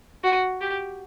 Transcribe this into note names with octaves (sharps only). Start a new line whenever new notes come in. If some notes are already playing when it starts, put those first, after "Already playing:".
F#4
G4